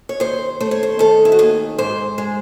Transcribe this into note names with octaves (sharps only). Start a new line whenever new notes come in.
C#5
D#2 C5
A3 C5
C#5
C5
D#3 A4
E4
F#4
D#2 G#4
G#2 C5
G#3